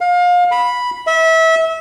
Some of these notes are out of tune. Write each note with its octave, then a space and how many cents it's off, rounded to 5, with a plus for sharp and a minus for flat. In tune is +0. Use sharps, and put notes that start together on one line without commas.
F5 +30
B5 -5
E5 -25